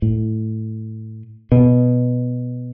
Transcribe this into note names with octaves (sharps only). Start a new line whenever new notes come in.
A2
B2